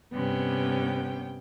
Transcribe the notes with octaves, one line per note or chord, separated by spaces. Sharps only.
G2 C3 B3 C#4 G5